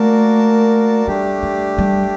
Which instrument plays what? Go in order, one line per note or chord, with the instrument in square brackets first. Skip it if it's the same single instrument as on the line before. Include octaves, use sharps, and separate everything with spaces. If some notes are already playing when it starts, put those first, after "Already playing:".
Already playing: [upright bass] A3 [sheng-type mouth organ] A#3 F#4 A#4 D5 A5
[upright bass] G3 [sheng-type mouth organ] A3 D4 G4
[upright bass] G3
G3